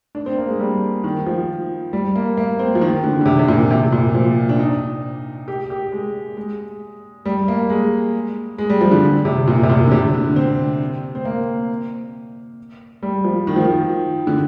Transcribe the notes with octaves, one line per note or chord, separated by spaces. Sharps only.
D4
C4
A#3
G#3
G3
D#3
F3
G3
A#3
A#3
C4
F3
D#3
D3
D3
C3
C3
A#2
C3
A#2
F3
D4
D#4
G4
G4
G#3
G#3
G3
A#3
G#3
G#3
G3
F3
D3
C3
A#2
C3
A#2
D3
C3
D3
C4
C4
A#3
G3
F3
D#3
F3
D#3
D3